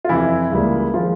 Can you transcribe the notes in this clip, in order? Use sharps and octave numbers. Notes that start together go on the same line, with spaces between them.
F4
F2 C3 E3 E4
C#2 C#3 E3 G3 A#3
D#3 F3 G#3 F4